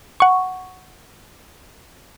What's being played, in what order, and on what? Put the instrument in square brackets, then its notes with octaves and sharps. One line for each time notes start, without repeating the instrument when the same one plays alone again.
[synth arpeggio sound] F#5 C#6